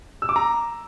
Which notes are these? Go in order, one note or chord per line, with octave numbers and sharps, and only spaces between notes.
E6
D6
A#5